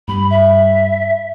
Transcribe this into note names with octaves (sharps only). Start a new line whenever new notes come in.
G2 G3 B5
E5